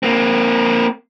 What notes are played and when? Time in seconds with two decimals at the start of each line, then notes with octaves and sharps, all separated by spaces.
0.03 A#3 C4